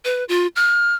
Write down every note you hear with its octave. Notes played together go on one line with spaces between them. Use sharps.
B4
F4
F6